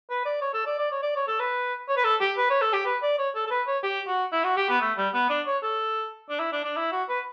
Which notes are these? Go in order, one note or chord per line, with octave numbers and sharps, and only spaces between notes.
B4
D5
C#5
A4
D5
D5
C#5
D5
C#5
A4
B4
C#5
B4
A4
G4
B4
C#5
A4
G4
B4
D5
C#5
A4
A4
B4
C#5
G4
F#4
E4
F#4
G4
B3
A3
G3
B3
D4
C#5
A4
D4
E4
D4
D4
E4
F#4
B4